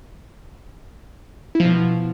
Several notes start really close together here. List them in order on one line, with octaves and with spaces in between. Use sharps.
E4 F3 B2